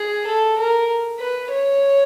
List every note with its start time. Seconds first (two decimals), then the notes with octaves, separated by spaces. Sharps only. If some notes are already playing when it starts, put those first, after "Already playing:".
Already playing: G#4
0.27 A4
0.59 A#4
1.20 B4
1.51 C#5